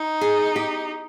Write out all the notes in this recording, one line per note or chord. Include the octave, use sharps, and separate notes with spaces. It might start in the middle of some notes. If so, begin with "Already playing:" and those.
Already playing: D#4
G#4
G4